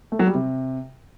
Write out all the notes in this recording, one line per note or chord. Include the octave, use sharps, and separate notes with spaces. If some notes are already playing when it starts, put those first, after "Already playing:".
A3
F#3
G3
C3